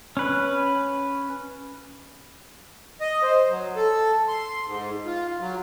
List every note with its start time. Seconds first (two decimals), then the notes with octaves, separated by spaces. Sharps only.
0.17 C#4 B4
3.01 D#5
3.22 C5
3.50 F#3
3.76 A4
4.28 C6
4.66 G#2
5.06 F4
5.41 F#3